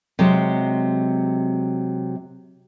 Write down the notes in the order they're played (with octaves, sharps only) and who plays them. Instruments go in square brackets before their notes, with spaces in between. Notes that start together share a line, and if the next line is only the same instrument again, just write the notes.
[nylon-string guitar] C3 F#3 G#3